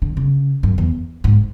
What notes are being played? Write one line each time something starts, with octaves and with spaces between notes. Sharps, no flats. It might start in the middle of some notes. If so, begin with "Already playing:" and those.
D3
C#3
F#2
E2
G#2